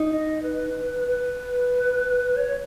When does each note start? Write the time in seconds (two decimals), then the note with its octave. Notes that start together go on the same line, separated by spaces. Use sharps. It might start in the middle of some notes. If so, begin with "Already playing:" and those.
Already playing: D#4
0.09 D#5
0.42 B4
1.07 B4
2.36 C#5